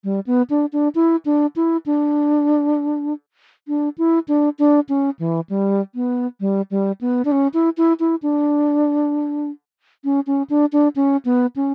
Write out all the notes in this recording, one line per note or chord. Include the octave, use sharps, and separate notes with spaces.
G3
B3
D4
D4
E4
D4
E4
D4
D4
E4
D4
D4
C#4
E3
G3
B3
G3
G3
B3
D4
C#4
E4
E4
E4
D4
C#4
C#4
D4
D4
C#4
B3
C#4